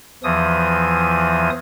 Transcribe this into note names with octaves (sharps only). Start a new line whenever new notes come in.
E2 E3 F3 D#6